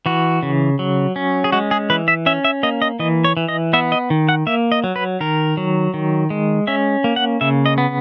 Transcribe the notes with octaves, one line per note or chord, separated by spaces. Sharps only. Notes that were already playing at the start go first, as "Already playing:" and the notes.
E3 F#4
C#3
F#3
C#4
G#4
G#3 F#4
G#4
E3 B4
E5
C#4 E5
E5
A#3 D#5
D#5
E3 D#5
C#5
E3
D#5
B3 E5
D#5
D#3
F#5
A#3 E5
D#5
F#3
B4
D#3 A#4
F#3
D#3
G#3
C#4 E5
A#3
F#5
C#3 E5
D#5
B3